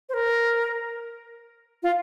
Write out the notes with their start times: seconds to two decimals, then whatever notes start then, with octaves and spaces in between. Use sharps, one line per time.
0.09 C5
0.14 A#4
1.83 F4